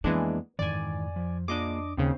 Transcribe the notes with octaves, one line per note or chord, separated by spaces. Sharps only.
F2 E3 G#3 A#3 B3 D4 G#4
F2 G#2 D#3 E3 D5 G#5
F3
A#3 D4 F4 G#4 D#5 D6
D#2 C#3 C4 C#4 C5